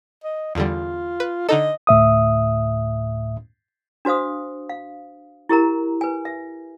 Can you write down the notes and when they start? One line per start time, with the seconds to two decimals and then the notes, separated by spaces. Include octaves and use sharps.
0.24 D#5
0.55 E2 D3 G3 F4
1.20 B4
1.49 D3 D#4 A4 D#5
1.87 D2 A2 E5 D#6
4.05 D4 F#4 C5 F5 D#6
4.69 F5
5.49 E4 G4 A#4 A#5
6.01 B4 G#5
6.25 E5